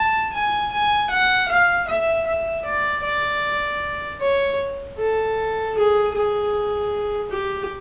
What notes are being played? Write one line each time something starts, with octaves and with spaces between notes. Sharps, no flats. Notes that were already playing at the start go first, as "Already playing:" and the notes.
Already playing: A5
G#5
G#5
F#5
F5
E5
E5
D5
D5
C#5
A4
G#4
G#4
G4